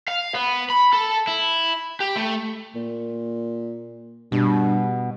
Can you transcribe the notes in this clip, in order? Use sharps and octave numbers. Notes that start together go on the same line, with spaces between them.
F5
B3
B5
A4
E4
G4
A3
A#2
G2 B2